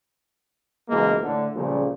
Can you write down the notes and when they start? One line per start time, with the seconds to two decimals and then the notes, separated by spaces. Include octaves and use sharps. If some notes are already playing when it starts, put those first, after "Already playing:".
0.89 C#2 B2 E3 G#3 A#3
1.22 A2 D3
1.56 C#2 A#2 C#3 F3 G3 A3